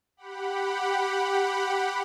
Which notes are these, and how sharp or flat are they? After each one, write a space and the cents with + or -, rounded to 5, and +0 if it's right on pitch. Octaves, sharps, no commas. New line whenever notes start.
G4 +0 F#5 +0 B5 +0